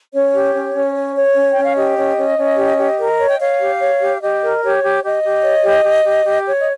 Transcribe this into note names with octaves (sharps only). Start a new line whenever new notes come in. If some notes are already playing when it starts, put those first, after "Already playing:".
C#4 C#5
G4
C#4
C#4
C#5
C#5
C#4
C#4 G5
F5
G4 D#5
C#4
C#4
C#4
G4
G4
A#4
C#5
G5
C#5 F5
G4
C#5
G4
G4 D#5
A#4
G4 C#5
G4
G4 D#5
G4
C#5
G4
G4
G4
G4
C#5
D#5